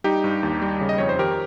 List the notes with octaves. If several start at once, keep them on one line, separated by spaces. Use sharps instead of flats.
G3 D#4 G4
G2
D#2
G3
C#3
D#5
F2 C#5
C5
D#3 G4 A#4